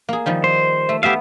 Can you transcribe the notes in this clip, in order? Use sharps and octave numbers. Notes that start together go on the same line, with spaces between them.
A#3 G#4
D#3 F3 G3
C5
A3
A3 B3 G4 E5 F5